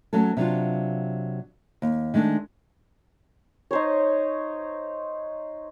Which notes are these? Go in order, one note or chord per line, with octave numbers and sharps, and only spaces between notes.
F#3 A3 C#4 A4
C3 F#3 D4 F4
D#2
D#3 G#3 A3 D4
D#4 C5 C#5